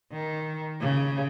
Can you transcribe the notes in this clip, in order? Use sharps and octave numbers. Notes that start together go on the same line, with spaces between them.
D#3
C#3